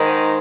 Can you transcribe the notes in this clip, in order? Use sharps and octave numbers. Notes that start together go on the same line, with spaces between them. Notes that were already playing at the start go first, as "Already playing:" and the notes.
Already playing: G#2 D#3